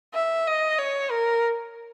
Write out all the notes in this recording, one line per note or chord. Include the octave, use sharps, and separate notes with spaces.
E5
D#5
C#5
A#4